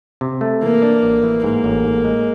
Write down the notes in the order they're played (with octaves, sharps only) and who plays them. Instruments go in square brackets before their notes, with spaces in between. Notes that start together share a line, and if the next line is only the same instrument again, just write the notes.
[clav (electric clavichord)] C3
A3
[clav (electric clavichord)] E3 [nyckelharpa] A#3
[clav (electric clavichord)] D4
A1
E3
[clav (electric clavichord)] G#2 [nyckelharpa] A#3
[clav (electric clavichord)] A1
G#2
G#3